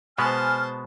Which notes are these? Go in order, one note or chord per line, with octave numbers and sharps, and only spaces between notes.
B2 G#3 B3 C5 G#5 A5 F6